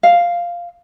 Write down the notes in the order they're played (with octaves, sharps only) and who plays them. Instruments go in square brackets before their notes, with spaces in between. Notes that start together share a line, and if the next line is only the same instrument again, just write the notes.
[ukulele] F5